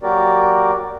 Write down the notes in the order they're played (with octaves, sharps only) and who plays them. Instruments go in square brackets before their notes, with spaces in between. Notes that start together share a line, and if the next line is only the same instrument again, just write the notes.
[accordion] F#3 A#3 F#4 G4 A#4 D5